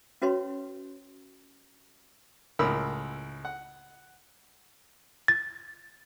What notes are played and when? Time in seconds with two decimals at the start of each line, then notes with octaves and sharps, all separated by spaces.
0.22 C#4 F#4 B4 C#5 C6
2.59 C#2 A2 A#4 B5 E6
3.45 F#5
5.28 A6